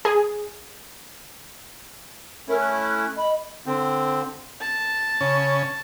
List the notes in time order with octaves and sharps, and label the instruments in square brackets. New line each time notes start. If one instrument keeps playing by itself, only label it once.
[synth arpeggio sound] G#4
[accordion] A3 C#4 E4 [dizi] A#4
[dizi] F#6
[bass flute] D#5 [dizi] B5
[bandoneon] D3 C4
[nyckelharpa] A5
[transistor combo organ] C#3 C#4